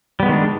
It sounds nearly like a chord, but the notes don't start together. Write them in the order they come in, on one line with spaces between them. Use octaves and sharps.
G3 B3 G#3 D#3 D4